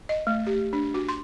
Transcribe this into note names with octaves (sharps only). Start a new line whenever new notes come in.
D#5
A3
G4
D4
F#4
C6